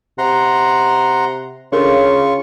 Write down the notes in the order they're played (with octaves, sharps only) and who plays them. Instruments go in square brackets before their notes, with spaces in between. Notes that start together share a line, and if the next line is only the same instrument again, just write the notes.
[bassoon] C3 [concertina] F#5 A#5 C6
[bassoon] C#3 [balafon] D4 A4 A#4 [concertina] F4 C#6 [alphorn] C#5